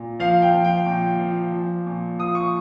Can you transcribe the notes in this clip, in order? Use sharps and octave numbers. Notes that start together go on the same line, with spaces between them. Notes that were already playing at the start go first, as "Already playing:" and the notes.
Already playing: A#2
F3 F5
G5
F3
G5
A#2
F3
F3
A#2
F3 D#6
C#6